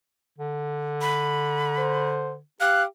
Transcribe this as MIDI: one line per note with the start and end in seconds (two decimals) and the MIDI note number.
0.39 2.40 50
1.01 2.09 83
1.78 2.35 72
2.60 2.86 67
2.60 2.84 77
2.60 2.82 90